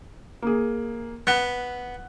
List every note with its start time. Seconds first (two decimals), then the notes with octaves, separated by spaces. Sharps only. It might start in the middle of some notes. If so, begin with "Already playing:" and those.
0.42 A#3 G#4
1.27 B3 F#6